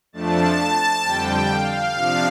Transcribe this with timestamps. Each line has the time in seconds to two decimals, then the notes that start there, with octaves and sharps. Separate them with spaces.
0.12 F2 F3 A3 D4 A5
1.04 F2 D3 G3 G5
1.49 F5
1.94 C3 F3 D4